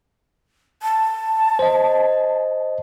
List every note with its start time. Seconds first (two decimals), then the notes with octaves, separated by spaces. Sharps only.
0.83 A5
1.59 C5 D#5